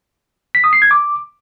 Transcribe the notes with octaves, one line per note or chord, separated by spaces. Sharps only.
B6
D#6
C7
G#6
D6